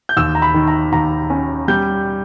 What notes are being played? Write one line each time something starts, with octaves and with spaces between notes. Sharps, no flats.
G6
D#2 E6
A#5
B5
D#3
A#5
D#2 A#5
C#4
G3 G6